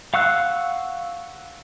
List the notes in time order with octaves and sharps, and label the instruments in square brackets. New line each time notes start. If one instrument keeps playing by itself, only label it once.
[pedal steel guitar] F5 F#5 C#6 E6 F#6